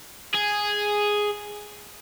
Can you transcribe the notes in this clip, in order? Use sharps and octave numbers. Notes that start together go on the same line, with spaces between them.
G#4